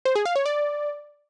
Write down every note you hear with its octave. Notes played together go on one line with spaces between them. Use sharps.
C5
G#4
F5
C#5
D5